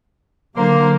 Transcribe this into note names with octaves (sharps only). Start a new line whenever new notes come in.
D3 F#3 A#3 C5